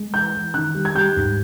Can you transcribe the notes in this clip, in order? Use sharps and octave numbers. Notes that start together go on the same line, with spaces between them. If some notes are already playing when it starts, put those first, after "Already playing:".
Already playing: G#3
E3 G6
E3
D#3 F#6
G3
G#6
G3 G6
G#2